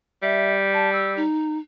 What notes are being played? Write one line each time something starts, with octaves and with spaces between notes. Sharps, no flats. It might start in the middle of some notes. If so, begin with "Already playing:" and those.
G3 E5
A5
E6
D#4